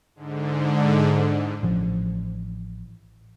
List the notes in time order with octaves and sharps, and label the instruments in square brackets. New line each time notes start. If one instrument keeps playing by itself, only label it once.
[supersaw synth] G#2 D3
[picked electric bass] A1 F3